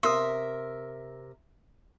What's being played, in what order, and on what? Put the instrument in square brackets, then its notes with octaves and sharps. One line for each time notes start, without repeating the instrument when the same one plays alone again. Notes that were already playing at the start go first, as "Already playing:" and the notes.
[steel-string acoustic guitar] C3 A#4 [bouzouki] E5 [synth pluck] C6 D#6